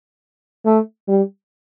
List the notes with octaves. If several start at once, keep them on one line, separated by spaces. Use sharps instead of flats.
A3
G3